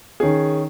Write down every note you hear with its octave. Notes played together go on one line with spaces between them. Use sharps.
D#3 C#4 G#4